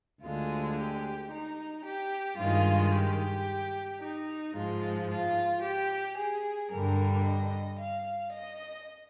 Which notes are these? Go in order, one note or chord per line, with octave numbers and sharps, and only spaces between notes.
D2 D3 G#3 F4
G4
D#4
G4
G2 D#3 G#3 F4
G4
D#4
G#2 F3 G#3 F4
F4
G4
G#4
G2 D3 G3 A#4
D#5
F5
D#5